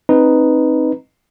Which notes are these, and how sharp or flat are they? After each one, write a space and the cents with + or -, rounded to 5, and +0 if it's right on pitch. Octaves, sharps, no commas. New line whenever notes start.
C4 +20 D#4 +0 B4 +0